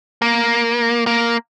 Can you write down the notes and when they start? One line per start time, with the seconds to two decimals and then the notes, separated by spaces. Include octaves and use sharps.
0.22 A#3
1.07 A#3